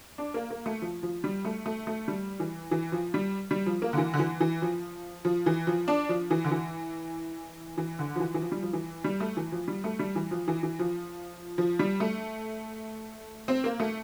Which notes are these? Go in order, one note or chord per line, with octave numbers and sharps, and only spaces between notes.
D4
A#3
A#3
A3
F3
F3
G3
A3
A3
A3
G3
E3
E3
F3
G3
G3
F3
A#3
D3
E3
D3
E3
E3
F3
F3
E3
F3
D4
F3
E3
D3
E3
E3
D3
F3
E3
E3
F3
G3
F3
E3
G3
A3
E3
F3
G3
A3
G3
E3
F3
E3
E3
F3
F3
G3
A3
C4
A#3
A3